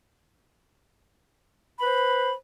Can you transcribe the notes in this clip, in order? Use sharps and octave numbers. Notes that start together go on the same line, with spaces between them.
B4 C5 B5